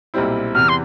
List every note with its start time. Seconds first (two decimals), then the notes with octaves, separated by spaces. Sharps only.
0.14 B1 A#2 G3 C4 E4
0.55 E2 C3 E3 F6
0.69 C6